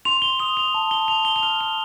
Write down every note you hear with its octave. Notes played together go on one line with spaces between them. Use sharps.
C6 F7
G7
D#6 F7
F7
A5
G7
A5 F7
G7
F7
F6 G7
F7